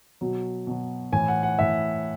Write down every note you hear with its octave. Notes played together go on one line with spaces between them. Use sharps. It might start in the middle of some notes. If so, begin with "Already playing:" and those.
B2 F#3
B2 F#3
A2 E3 G#5
F#5
F#5
A2 E3 E5